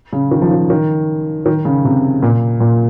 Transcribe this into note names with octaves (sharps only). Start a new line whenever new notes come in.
C#3
D#3
F3
D#3
D#3
D#3
C#3
C3
A#2
A#2